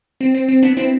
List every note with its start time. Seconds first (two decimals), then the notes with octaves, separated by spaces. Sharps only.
0.21 C4
0.35 C4
0.49 C4
0.63 B3 D4
0.77 C4 E4